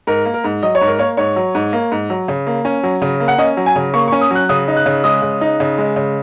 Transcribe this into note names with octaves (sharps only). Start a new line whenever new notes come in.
G#2 A#4
A#3
A#4
G#2
F#3 D#5
C#5
G#2
A#4
A#3 C#5
G#2 C#5
F#3
G#2
A#3
G#2
F#3
C#3
A#3
C#4
F#3
C#3
A#3
F#5
C#4 D#5
F#3
G#5
C#3
A#3 C#6
C#6
C#4
D#6
F#3 F#6
C#3 D#6
D#4
F#6
C#3
G#3 D#6
C#3
D#4
C#3
G#3
C#3